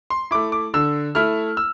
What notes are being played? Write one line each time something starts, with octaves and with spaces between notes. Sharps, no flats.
C6
A3 E4 D6
D6
D3 E6
A3 E4 F6
E6